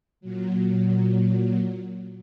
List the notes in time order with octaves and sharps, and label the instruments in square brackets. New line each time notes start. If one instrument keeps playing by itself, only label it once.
[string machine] A#2 F#3